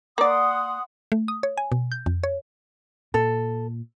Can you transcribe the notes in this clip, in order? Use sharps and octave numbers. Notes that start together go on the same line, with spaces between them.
A#3 D5 F#5 C6 D#6
A3
D#6
C#5
G#5
B2
G6
F2
C#5
A#2 A4